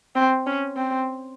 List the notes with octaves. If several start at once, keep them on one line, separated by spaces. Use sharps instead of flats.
C4
C#4
C4